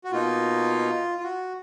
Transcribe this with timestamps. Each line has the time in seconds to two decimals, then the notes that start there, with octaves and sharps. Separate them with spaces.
0.05 F#4
0.12 B2 A#3 D#4 F4
1.18 F4
1.24 F#4